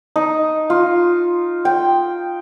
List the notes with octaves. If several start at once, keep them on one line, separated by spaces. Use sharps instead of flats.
D#4
F4
G5